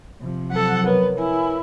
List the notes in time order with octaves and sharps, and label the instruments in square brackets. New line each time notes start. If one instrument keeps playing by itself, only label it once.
[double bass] C3 F3
[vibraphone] F#3 [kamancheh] A4 F#5
[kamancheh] B3 [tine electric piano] A#4 B4 C#5
[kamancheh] E4 [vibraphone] G#5